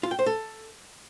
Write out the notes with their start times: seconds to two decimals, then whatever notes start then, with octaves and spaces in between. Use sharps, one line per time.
0.03 F4
0.11 G5
0.19 C5
0.26 A4